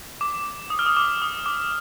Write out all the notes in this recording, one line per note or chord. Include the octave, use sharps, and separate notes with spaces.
D6
D#6
F6
D#6
D6
D#6
D6